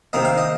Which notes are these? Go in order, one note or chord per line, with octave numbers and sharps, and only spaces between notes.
C3 D#3 A#3 D#5
F5
D#5